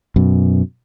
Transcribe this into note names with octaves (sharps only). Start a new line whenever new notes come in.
F#2 B2